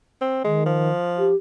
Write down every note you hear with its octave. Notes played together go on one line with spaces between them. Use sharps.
C4
D#3 G#3
F3
G4